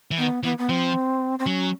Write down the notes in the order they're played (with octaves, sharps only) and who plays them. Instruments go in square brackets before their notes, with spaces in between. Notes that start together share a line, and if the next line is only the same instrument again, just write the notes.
[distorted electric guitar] E3
[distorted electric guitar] D#3 [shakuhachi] B3
[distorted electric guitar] E3 [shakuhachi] B3
[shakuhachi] B3
[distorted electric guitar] F3 [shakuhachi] C4
[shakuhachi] C4
[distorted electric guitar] F#3 [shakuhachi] C#4